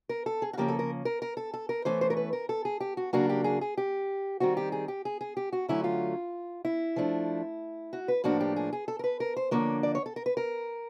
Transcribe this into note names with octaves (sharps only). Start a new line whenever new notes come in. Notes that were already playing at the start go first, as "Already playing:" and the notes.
A#4
A4
G#4
F#4
C#3 F3 A#3 C#4 G4
A4
A#4
A#4
A#4
A4
A4
A#4
E3 A3 C#4 C5
C5
A#4
B4
A#4
A4
G#4
G4
F#4
C#3 F#3 A#3 D4 F#4
G4
G#4
G#4
G4
D#3 G3 C4 F#4
G4
G#4
G4
G#4
G#4
G4
F#4
D3 F#3 A3 C#4 E4
F4
E4
F3 A3 D4
F#4
B4
A2 F3 A#3 D4 F#4
G4
G#4
G#4
A4
A#4
B4
A#4
C5
D3 F3 A#3 D4 C#5
D5
C#5
A4
A#4
B4
A#4